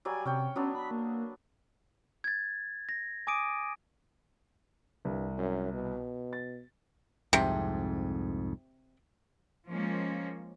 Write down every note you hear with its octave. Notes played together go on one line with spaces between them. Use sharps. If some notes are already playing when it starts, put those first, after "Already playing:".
F#3 G3 D5 G#5
C3 C#4 C#5 G5
F#3 B3 C#4 D4
B5
A#3
G#6 A6
A#6
G#5 D6 D#6 D7 D#7
C2 G2
F#2
B2
A6
C2 F2 G#2 C3
F3 G#3 A#3 C#4